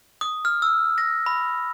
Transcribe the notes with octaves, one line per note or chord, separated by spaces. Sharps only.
D#6
F6
E6
A#6
B5